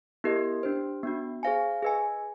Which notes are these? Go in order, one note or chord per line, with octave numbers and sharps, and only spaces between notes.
B3 E4 G4 A#4 D#5
D4 G4 C5
B3 D4 F#4
G#4 C5 F5 G#5
G#4 B4 D#5 G#5